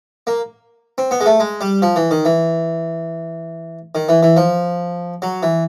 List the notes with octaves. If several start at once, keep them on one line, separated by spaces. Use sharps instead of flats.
A#3
C4
B3
G#3
A3
G#3
G3
F3
E3
D#3
E3
D#3
E3
E3
F3
F#3
E3